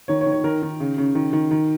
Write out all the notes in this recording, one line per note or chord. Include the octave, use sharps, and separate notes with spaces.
D#3 C#5
C#5
D#3
C#5
D#3 A#4
D#3
C#3
C#3
D#3
D#3
D#3